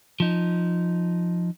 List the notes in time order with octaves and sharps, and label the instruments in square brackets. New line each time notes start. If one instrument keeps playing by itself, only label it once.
[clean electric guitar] F3 D#4